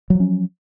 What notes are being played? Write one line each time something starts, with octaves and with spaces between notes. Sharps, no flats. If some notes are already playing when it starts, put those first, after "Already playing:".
F3 F#3 C#4